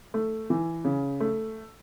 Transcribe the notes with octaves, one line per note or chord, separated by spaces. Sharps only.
A3
E3
C#3
A3